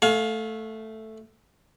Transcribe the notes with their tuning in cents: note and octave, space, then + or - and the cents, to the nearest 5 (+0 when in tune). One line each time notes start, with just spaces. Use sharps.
A3 +0 F5 +20 G#5 +40